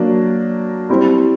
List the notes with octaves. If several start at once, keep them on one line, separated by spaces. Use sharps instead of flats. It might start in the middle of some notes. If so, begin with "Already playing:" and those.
Already playing: F#3 A#3 D4
G3 C4 E4